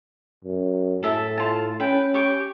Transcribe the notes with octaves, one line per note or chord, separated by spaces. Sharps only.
F#2
A2 A4 E5 A5
F4 A5
C#4 B4 G5
G4 C#6 D6